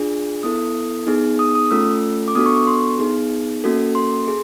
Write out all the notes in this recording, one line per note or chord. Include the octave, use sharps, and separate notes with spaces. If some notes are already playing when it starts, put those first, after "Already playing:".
Already playing: D4 F4 G#4
B3 E4 A4 D#6
B3 D#4 G#4
D#6
D#6
A3 C#4 F4 A4 E6
D6
B3 D4 F#4 A4 D#6
C#6
C#6
C6
B3 D#4 G#4
A#3 C#4 F#4 A4
C6
G#4